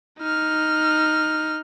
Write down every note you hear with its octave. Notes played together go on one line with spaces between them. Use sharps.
D#4 F6